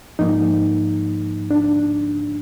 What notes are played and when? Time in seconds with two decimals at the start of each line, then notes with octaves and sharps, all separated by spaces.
0.19 G#2 F3 A#3 D#4
1.51 D4